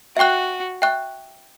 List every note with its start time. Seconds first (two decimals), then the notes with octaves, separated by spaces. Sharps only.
0.17 F#4 E5 G5 C#6 F#6
0.82 E5 G5 C#6 F#6